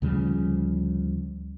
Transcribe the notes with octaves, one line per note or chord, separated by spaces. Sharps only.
D2 C#3 F3 G3